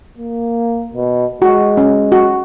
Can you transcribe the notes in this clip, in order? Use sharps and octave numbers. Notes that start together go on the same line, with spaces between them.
A#3
B2
G#3 F#4
C#4
F#4